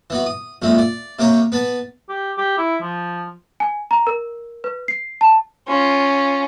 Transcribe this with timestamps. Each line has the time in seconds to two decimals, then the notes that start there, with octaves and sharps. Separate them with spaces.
0.10 E3 B3 F#4
0.26 D#6
0.62 A#1 F2 G#3 E4
0.78 D5
1.19 C3 A#3 G4 C#5 A#5
1.52 B3 B4 A5
2.09 G4
2.38 G4
2.58 E4
2.82 F3
3.60 G#5
3.91 A#5
4.07 A#4
4.64 B4
4.88 C7
5.21 A5
5.68 C#4 F4